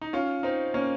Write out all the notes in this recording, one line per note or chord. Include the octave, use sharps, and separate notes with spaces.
D#4
C#4 F4
C4 D#4
A#3 C#4